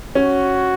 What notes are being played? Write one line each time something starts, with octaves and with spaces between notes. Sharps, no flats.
C#4 F#4